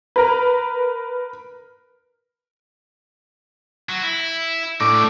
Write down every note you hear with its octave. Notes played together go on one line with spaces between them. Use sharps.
A#4 B4
F#3
E4
A2 D4 D#4 D5 D6